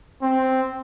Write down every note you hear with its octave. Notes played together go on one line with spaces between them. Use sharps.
C4